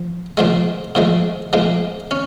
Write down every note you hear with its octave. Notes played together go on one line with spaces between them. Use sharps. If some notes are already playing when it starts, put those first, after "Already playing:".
Already playing: F3
A#2 F3 G#3
A#2 F3 G#3
A#2 F3 G#3
C#4